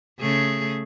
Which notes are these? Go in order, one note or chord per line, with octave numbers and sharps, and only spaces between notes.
C#3 A3 G#4